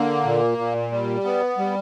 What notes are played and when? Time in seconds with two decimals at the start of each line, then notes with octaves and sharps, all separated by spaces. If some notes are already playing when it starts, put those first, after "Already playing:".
Already playing: D3 A#3
0.25 A#2
0.58 A#2
0.91 G3
1.24 B3
1.58 G3